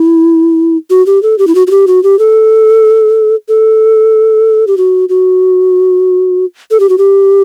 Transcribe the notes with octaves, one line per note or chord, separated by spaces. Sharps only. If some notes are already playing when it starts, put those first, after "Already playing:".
Already playing: E4
F#4
G4
A4
G4
E4
F#4
F#4
G4
F#4
G4
A4
A4
G4
F#4
F#4
A4
G4
F#4
G4